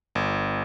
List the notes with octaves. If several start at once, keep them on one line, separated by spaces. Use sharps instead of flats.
G1